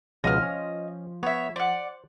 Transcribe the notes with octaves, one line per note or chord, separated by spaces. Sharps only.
C#2 B2 F3 D#5 F5 F6
C#4
B3 C#5 E5
C5 D5 F#5